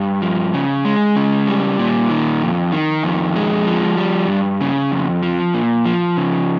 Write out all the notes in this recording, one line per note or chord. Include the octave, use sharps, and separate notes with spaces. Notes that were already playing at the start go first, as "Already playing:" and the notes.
Already playing: G2
F3
C#3
G#3
C#3
G3
A#2
D#3
F2
D#3
F2
G#3
F3
G3
G2
C#3
F2
F3
A#2
F3
C#3